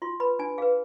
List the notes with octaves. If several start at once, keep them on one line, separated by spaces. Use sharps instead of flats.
F4 C6
B4 B5
D4 G#5
G#4 B4 F5